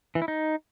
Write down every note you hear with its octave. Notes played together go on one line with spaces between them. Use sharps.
E3
E4
D#4